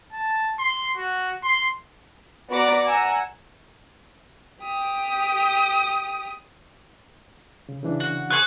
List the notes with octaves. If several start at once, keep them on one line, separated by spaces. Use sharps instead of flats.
A5
C6
F#4
C6
B3 F#4 D5 A#5 D6
F#5 G#5 A#5 E6
G4 D#6
C#3
C#3 E3 D4
F#4
G#4 C5 C#6 F#6